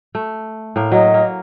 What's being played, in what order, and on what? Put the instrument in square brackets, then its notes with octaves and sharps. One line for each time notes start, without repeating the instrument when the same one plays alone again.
[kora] A3
A2 A#3
[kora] F#3 [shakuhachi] D#5
[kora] A#3